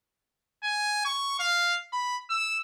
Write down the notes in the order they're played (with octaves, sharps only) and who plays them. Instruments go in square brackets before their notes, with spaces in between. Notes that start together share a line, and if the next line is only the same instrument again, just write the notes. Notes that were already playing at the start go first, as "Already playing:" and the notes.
[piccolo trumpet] G#5
C#6
F5
B5
E6